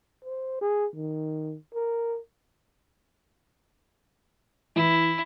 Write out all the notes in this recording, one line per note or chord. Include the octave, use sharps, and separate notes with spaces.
C5
G#4
D#3
A#4
E3 E4